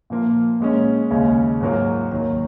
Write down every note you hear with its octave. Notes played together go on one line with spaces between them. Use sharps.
A#2 F3 A#3 F4
A#2 G#3 C#4
D#2 C#3 G#3 C#4
G#2 F#3 A#3 F4
D#2 D#3 F#3